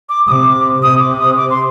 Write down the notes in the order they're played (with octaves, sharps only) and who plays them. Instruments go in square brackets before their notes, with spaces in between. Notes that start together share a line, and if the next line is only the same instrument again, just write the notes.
[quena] D6
[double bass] C3 [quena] D6 D#6
[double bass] C3 [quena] D#6
[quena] D6
D#6
D6
C6